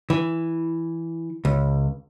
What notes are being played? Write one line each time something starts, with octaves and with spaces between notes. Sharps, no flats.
E3
C#2